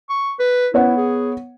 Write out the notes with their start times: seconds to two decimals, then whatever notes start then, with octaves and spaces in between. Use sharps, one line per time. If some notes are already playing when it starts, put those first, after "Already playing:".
0.09 C#6
0.39 B4
0.74 B3 E4 C#5 F#5
0.96 G#4